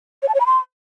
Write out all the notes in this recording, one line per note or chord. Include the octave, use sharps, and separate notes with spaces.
C#5
A5
C#5
B5
C6